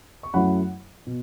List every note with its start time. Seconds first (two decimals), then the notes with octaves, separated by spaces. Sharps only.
0.23 C#6
0.34 F#2 F#3 A3 C#4 E4 F#5 B5
1.07 B2